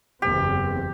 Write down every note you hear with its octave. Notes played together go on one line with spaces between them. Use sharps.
F#1 E2 C4 G4